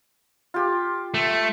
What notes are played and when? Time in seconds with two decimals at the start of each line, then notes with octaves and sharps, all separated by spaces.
0.54 F4 G4
1.14 A3